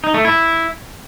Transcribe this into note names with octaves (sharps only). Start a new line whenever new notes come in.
D#4
A3
E4